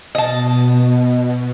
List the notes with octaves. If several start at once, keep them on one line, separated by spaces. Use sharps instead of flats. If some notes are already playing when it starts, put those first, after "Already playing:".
B2 D#5 A5